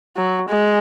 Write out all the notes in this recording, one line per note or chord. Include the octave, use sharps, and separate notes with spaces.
F#3
G#3